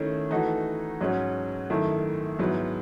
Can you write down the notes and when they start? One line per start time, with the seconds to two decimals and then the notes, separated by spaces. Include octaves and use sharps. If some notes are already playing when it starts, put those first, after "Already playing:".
Already playing: D#3 A3 C#4 E4
0.31 E3 A3 D#4 F#4
1.01 G#2 F#3 C#4 F#4
1.70 F#2 D#3 A3 E4
2.39 G#2 F#3 B3 E4